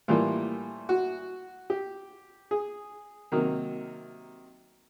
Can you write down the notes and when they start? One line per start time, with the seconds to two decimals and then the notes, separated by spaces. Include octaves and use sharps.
0.08 A2 E3 G3 A#3 F4
0.89 F#4
1.70 G4
2.51 G#4
3.32 C3 D#3 F#3 A#3